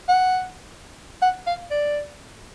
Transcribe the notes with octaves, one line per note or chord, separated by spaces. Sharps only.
F#5
F#5
F5
D5